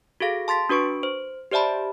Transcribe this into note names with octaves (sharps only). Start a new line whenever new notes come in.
F#4 G#4 A4 F5 A#6
A5 C6 A6 B6
D4 F#4 B4 C#6 D7
C5
G4 C5 D5 E5 A5 B5